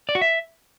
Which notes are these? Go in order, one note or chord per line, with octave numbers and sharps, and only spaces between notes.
D5
F#4
E5